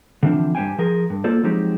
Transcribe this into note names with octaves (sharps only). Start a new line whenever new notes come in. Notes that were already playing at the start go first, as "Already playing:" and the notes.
D3 E3 F3 C4 D4
G2 G3 C5 F5 G5 G#5
F3 G#4 A#4
G2
A#3 F4 A4 C5 D5
F3 F#3 G#3 C4 D#4 G4